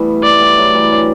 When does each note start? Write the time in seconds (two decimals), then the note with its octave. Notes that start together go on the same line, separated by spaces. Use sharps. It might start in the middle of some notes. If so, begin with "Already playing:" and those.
Already playing: E3 G3 A3 B3
0.23 D5
0.31 A3
0.40 G3 B3
0.57 F#3 A3
0.75 E3 G3
0.92 D3 F#3